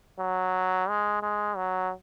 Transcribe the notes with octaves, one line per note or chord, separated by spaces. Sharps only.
F#3
G#3
G#3
F#3